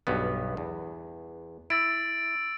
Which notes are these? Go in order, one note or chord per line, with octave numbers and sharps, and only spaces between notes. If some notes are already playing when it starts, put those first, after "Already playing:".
B1 G2 B3
E2
E4 E6 A6 D7